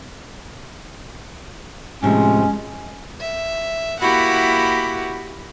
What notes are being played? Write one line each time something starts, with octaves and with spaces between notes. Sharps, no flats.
A2 C3 F3 G#3 C#4
E5
A#3 E4 F#4 G4 F#5 B5